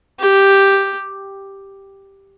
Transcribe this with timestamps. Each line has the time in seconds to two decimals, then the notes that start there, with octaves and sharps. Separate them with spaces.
0.19 G4